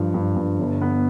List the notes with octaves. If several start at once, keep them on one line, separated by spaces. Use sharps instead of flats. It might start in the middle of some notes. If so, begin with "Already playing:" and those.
Already playing: G2 F3
G2
G2
G1
B3